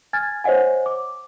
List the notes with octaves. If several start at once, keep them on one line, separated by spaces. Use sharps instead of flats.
G#5 F6 G#6 A6
C5 C#5 D#5 F#5 G#5
D6